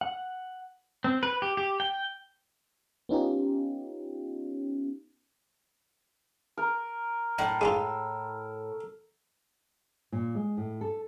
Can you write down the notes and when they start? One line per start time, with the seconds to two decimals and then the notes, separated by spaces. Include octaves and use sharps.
0.01 F#5
1.04 C4
1.23 B4
1.42 G4
1.57 G4
1.80 G5
3.09 B3 C#4 D#4 F4 G4
6.57 A#4
7.39 A2 D4
7.61 G#3 D4 F4 E6
10.12 A#2
10.35 G#3
10.57 A2
10.81 A4